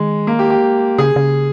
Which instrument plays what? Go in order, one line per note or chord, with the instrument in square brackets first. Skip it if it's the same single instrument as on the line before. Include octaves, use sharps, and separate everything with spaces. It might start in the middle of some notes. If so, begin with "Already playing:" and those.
Already playing: [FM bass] D#3 [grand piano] G#3
[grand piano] A#3
G4
G4
[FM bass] C#3 [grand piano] G#4
[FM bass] C#3